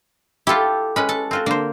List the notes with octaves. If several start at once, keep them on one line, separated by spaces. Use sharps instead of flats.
E4 F4 G4 A4
G#3 C#4 B4 B5
A4
C4 F4 F#4
D3 A#3 C5